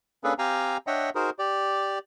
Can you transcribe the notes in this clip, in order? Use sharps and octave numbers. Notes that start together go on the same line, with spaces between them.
A#3 C#4 D4 G#4 A4 B4
C4 G4 F5 G5 G#5 A#5
D4 C#5 D#5 E5 F#5 G5
D#4 F#4 G#4 A#4 C5
G4 D5